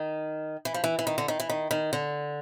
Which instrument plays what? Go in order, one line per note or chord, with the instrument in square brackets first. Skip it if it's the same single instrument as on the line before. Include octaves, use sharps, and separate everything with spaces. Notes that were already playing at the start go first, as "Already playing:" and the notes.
Already playing: [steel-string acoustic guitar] D#3
E3
F3
E3
E3
D#3
D3
D#3
E3
D#3
D#3
D3